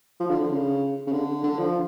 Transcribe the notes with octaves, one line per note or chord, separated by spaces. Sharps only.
F3
D3
D3
C#3
C#3
D3
D3
F3